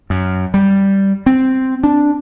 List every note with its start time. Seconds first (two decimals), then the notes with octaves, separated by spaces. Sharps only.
0.10 F#2
0.54 G3
1.26 C4
1.84 D4